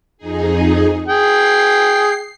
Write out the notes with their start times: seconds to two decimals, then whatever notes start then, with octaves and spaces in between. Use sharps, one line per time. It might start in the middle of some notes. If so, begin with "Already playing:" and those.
0.18 F2 D#4 G#4
1.08 G#4 G5 C7